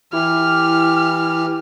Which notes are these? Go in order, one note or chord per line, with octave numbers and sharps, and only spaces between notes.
E3 E4 G4 F6